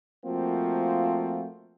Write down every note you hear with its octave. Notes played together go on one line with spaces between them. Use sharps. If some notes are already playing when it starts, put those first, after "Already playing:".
F3 A3 A#3 C4 F4 F#4